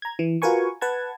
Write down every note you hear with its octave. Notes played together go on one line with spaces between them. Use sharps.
A#5 G#6
E3
F4 F#4 A#4 B4 G#5 C#6
B4 F#5 A5 G#6